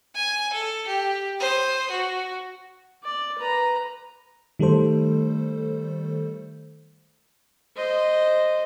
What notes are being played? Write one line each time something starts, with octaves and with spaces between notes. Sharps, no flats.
G#5
A4
G4
C5 D#6
F#4
D5
B4 A#5
D#3 G3 A3 A4 C5
C5 D#5